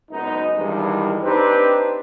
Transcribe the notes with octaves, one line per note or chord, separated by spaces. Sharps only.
F#1 F#2 G#3 B3 D#4
E2 G2 D#3 E3 G3 G#3
C4 D4 D#4 G4 B4